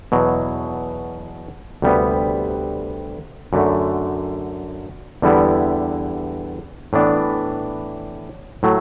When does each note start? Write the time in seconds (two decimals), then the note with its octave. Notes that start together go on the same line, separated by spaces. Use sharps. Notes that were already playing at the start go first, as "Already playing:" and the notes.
0.12 E2 B2 F#3
1.82 D2 C3 G3 B3
3.53 F#2 D3 A3
5.22 E2 D3 G3 B3 E4
6.93 A2 E3 B3 D4
8.63 A2 F#3 A3